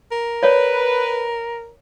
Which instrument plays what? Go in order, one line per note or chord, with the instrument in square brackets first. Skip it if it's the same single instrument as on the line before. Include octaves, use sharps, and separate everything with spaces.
[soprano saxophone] A#4
[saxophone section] B4 [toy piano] C#5 D5